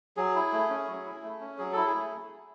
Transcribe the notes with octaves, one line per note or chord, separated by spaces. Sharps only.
F#3 G#4
E4
A3
C#4
F#3
E4
A3
C#4
F#3 G#4
E4 A4
G#4
A3